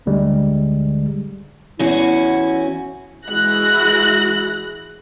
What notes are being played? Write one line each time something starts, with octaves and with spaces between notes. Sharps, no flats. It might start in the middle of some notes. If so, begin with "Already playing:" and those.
A1 D2 D3 G3 G#3
E2 C#4 E4 F#4
E3 G#3 E4 F#4 F#6 A#6